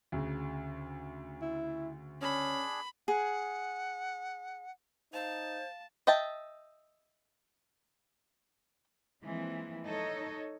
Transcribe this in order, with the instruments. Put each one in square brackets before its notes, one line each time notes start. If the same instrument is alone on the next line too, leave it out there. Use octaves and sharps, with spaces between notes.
[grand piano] D2 C#3
[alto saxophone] E4
[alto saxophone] C#4 [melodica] D4 G#4 [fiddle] B5
[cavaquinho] G#4 [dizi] F#5
[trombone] D#4 [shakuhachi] C5 [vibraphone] F5 [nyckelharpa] A5
[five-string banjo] D#5 E5 G5 A5
[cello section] E3 F3 G#3 A#3 C4
D#4 A4 C#5 D#5